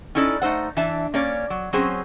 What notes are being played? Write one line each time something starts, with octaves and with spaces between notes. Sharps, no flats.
C#4 D#4 E4 A4 D5
A3 D#4 C5 F#5
E3 D4 E5 A5
A#3 C#4 C#5 D5
F#3
F#3 C4 C#4 G#4 C5